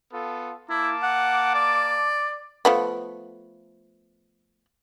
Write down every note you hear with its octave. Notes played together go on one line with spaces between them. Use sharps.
B3 F4 A4
A#3 E4 A5 D6
F#5
D5
F3 A3 B3